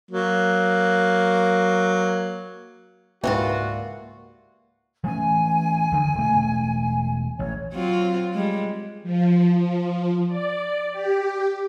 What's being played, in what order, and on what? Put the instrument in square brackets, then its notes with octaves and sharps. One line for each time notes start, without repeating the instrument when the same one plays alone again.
[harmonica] F#3 A#3
[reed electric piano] C#2 G#2 [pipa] E3 G3 F4 [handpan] A#3 [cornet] F#4
[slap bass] E3 A3 C#4 [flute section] G#5
[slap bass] D2 D3
E1 A3
[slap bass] A1 [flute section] C#5
[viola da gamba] F#3 C4 F4
G3 G#3
[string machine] F3
F3
D5
G4